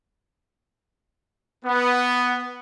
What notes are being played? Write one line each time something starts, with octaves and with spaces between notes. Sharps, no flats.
B3